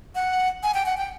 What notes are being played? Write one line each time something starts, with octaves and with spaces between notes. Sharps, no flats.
F#5
G#5
G5
F#5
G5